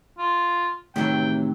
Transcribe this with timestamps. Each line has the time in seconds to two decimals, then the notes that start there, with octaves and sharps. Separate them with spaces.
0.18 F4
0.96 A2 C3 D#3 E3 F#3 G5